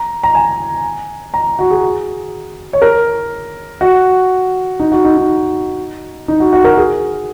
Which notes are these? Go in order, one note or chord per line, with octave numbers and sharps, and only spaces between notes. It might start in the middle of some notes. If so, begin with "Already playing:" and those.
Already playing: A#5
A#5
G#5
A#5
F#4
G#4
C#5
A#4
F#4
D#4
F#4
D#4
D#4
D#4
F#4
F#4
A#4
G#4